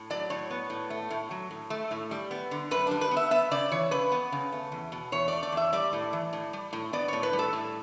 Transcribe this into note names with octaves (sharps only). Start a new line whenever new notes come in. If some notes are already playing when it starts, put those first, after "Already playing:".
Already playing: A2
F#3 D5
A2 C#5
B3
A2
A3
A2
F#3
A2
A3
A2
G3
B3
D3
F#2 B4
G3 D4
B4
B3
E5
B3 E5
C#3 D5
E3 C#5
C#3 B4
B3
C#3
A3
E2
B2
E2 C#5
A3 D5
D5
E2 E5
G3 D5
A2
E3
A2
G3
A2
B3 D5
A2 C#5
B4
G3
A4
A2